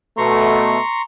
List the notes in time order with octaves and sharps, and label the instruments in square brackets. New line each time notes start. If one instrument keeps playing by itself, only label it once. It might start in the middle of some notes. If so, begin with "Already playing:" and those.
[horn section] B2 A3 [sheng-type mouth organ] A#5 C6 C#6